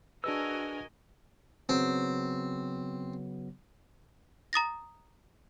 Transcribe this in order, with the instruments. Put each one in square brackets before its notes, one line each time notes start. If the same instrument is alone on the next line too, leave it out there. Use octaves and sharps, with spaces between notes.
[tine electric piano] D4 G#4 B4 [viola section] F#4 A#4 G#5 [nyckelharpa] D#5 [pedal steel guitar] E6
[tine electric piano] C#3 F#3 B3 [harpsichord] C4
[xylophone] A#5 D#6 A6 A#6